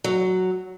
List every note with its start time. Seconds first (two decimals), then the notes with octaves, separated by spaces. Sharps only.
0.04 F#3